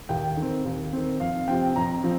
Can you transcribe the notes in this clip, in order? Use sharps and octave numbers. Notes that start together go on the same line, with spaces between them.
D#2 G5
D#3 C4
D#2
D#3 C4
F2 F5
C3 F3 C4 G5
F2 A#5
F3 C4